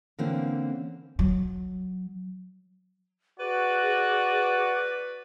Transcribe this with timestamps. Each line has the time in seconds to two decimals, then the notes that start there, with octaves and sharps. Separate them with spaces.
0.19 D3 E3 A#3 C4 C#4
1.19 F#3
3.40 F#4 G#4 B4 D5